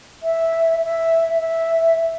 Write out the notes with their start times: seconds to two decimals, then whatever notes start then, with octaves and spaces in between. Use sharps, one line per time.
0.23 E5
0.84 E5
1.38 E5